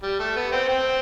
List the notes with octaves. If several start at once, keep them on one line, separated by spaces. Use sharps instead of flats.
G3
A3
B3
C4
C4